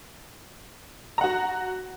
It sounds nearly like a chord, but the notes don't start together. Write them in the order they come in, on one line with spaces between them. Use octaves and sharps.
A#5 F#5 F#4